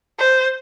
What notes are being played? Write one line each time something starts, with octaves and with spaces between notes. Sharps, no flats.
C5